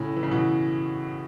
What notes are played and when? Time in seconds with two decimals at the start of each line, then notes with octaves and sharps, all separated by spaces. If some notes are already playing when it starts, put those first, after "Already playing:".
Already playing: A2 C#3
0.16 E3
0.23 C#3
0.31 B2 E3